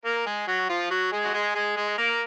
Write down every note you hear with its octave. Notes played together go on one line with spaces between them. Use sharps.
A#3 A#4
G#3 G#4
F#3 F#4
F3 F4
F#3 F#4
G#3 G#4
F#4
G#3 G#4
G#3 G#4
G#3 G#4
A#3 A#4